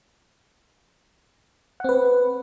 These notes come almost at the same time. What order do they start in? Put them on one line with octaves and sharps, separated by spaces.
F#5 C4 B4